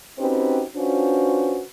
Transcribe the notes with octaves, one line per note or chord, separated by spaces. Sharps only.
C4 C#4 D#4 F#4 G4 B4
C#4 D4 F4 F#4 B4 C5